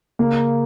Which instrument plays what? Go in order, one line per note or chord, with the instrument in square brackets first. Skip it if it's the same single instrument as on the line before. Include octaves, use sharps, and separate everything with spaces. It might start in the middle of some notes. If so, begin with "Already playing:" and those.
[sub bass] C#3 [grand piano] A#3